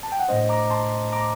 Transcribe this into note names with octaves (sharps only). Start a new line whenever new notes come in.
A5
G5
F#5
A2 A3 D4 C5 D#5
A#5 D6
A5 C6
A#5 D6